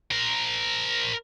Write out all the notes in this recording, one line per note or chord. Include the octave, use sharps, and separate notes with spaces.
A#4 C5